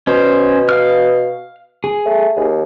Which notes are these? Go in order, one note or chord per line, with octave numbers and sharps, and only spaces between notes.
B2 C#4 C5
F5 F6
G#4
A3
D#2